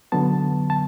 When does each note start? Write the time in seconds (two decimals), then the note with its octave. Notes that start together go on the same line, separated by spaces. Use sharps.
0.12 D3 F#3 B3 A5
0.70 A5